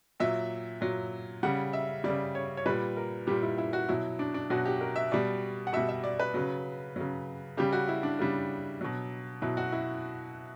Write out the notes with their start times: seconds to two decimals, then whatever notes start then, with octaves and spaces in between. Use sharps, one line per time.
0.20 A#2 F#3 E5
0.81 A#2 F#3
1.43 C#3 G3 F#5
1.73 E5
2.04 C#3 G3 D5
2.35 C#5
2.57 C#5
2.66 A#2 G3 B4
2.97 A#4
3.27 A#2 G3 G4
3.43 E4
3.58 E4
3.73 F#4
3.89 B2 F#3 E4
4.19 D4
4.34 D4
4.50 B2 F#3 F#4
4.65 G4
4.81 A#4
4.96 E5
5.12 B2 G3 D5
5.67 F#5
5.73 B2 G3 E5
5.89 E5
6.04 D5
6.20 B4
6.34 C#3 F#3
6.96 C#3 F#3
7.57 C#3 G3 G4
7.73 F#4
7.88 E4
8.03 D4
8.19 C#3 G3 D4
8.81 B2 F#3
9.42 B2 F#3 E4
9.57 F#4
9.72 E4